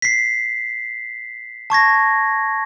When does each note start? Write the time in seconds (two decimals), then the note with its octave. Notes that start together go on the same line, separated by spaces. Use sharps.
0.02 B6 C7
1.70 A5 C#6 G#6 A#6